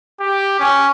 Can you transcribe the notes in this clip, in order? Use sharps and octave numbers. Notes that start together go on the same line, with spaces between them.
G4
C#4